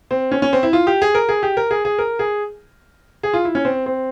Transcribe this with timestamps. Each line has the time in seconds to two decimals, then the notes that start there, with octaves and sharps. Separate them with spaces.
0.11 C4
0.32 C#4
0.42 C#4
0.53 C4
0.63 E4
0.73 F4
0.87 G4
1.02 G#4
1.15 A#4
1.29 G#4
1.43 G4
1.57 A#4
1.71 G#4
1.85 G#4
1.99 A#4
2.19 G#4
3.23 G#4
3.33 F4
3.45 E4
3.55 C#4
3.65 C4
3.86 C4